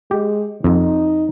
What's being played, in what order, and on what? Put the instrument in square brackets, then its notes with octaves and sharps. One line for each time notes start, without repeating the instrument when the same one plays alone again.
[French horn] G#3 [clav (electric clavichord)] G4
[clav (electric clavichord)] F2 [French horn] D#4